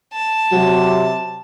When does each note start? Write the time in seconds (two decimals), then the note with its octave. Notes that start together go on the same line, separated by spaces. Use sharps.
0.13 A5
0.52 C3 F#3